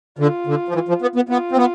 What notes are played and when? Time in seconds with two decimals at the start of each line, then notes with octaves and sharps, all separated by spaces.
0.19 D3 F4
0.47 D3
0.68 F3
0.74 E3
0.88 F3
1.02 B3
1.16 B3
1.29 B3 F4
1.52 C4
1.57 B3